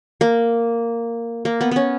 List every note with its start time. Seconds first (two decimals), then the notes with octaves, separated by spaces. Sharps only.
0.21 A#3
1.45 A#3
1.61 B3
1.71 B3 C#4